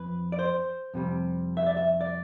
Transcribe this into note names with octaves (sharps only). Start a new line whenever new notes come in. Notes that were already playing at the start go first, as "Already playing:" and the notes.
Already playing: F2 F3 B4
D5
C5
F2 C3 G3
E5
D5
E5
D5